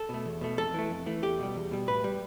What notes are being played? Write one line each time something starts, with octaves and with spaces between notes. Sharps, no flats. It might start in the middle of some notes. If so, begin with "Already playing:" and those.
Already playing: A4
B2 A3
E2
B2 A3
F2 A4
E3 A3
F2
E3 A3
E2 G4
B2 G3
E2
B2 G3
A2 B4
G3